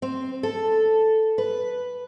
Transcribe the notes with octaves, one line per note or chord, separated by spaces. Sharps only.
C4
A4
B4